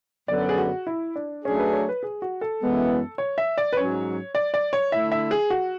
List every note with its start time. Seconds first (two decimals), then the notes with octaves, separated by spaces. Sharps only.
0.28 F#2 D3 F#3 B3 D5
0.49 G#4
0.58 F#4
0.87 E4
1.16 D4
1.45 F#3 A3 C#4 D4 G#4
1.59 B4
1.73 C#5
1.89 B4
2.03 G#4
2.22 F#4
2.41 A4
2.60 F#2 E3 G#3 B3 E4
3.18 C#5
3.38 E5
3.58 D5
3.73 B4
3.77 G#2 F#3 C#4 C#5
4.35 D5
4.54 D5
4.73 C#5
4.92 D3 A3 E4 E5
5.12 E5
5.31 G#4
5.50 F#4